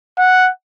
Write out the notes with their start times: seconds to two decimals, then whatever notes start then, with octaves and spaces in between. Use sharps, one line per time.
0.18 F#5